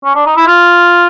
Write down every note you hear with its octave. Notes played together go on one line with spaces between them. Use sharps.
C#4
D4
D#4
E4
F4